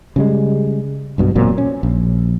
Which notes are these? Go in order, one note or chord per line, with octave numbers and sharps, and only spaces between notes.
C#3 G3 G#3
B1 G2 B2
E1 A#2 F#3 C4
C#4
A#1